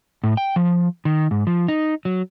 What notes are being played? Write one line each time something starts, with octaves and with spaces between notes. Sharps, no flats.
A2
G5
F3
D#3
G#2
F3
D#4
F#3